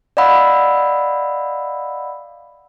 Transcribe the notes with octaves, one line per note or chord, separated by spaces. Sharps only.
D5 D#5 F5 F#5 B5 E6